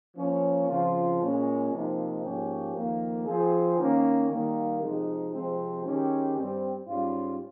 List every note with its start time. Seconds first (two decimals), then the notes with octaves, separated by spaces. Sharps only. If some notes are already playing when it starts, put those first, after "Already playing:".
0.16 F3 A#3 C#4
0.67 C#3 F3 C4 F4
1.19 A#2 G#3 C#4
1.71 C3 F3 A#3 D#4
2.22 G#2 F3 A#3 C#4 G4
2.74 F2 D#3 A#3
3.26 F3 C4 F4 G#4
3.77 D#3 A#3 C#4
4.29 D#3 G3 A#3
4.81 C3 F3 G#3 D#4
5.32 C3 F3 G#3 C4
5.84 D#3 G#3 C#4 G4
6.36 G2 G3 C4
6.87 G#2 G3 C#4 F4